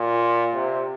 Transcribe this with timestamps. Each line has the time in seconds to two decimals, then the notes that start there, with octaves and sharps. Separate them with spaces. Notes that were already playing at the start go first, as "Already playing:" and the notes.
Already playing: A#2
0.54 C3